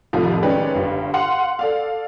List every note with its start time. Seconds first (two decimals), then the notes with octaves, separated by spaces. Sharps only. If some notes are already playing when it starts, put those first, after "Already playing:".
0.13 C2 F2 A2 C3 D#3 F3
0.42 D#3 G#3 C#4 G4 B4 D5
0.74 G1 G2
1.14 F5 F#5 C6
1.59 A4 D5 F5